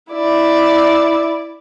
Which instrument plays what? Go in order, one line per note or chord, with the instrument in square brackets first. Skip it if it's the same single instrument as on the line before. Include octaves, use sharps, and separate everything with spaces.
[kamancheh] E4 D5